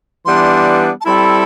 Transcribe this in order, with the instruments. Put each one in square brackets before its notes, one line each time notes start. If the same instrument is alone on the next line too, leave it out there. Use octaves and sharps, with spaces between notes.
[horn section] E3 G3 B3 D4 [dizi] C6
[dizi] A5
[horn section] G3 C4 E4 A4 [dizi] B5